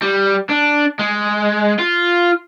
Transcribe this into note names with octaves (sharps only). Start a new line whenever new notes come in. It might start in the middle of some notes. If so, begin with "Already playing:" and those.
G3
D4
G#3
F4